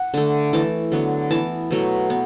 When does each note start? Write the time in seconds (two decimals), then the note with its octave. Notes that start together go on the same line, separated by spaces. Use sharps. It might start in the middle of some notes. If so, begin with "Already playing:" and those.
Already playing: F#5
0.14 D3 A3
0.53 E3 A3 A5
0.92 D3 F#3 B3
1.31 E3 B3 A5
1.71 B2 F#3 A3
2.10 B3